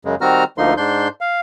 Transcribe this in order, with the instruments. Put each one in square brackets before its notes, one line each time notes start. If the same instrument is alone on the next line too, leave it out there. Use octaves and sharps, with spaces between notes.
[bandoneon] F#2 C#3 G#3
D#3 G3 C4 F#4 A#5 F6
D2 D3 F3 A#3 D#4 C6
G#2 D4 C6 G6
F5